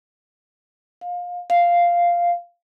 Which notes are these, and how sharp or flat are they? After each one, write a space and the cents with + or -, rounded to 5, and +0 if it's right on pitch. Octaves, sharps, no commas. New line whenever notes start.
F5 +25
F5 -5